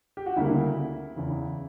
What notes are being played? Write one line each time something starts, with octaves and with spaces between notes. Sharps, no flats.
G4
F#4
D2 C#3 G3 A#3 E4
E2 C#3 E3